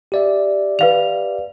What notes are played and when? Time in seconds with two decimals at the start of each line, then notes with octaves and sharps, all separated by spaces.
0.12 G4 D5 E5
0.79 B4 F5 F7